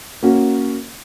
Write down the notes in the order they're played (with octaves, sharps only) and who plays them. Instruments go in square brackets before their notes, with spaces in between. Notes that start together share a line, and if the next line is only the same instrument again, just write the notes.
[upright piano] A#3 C#4 F#4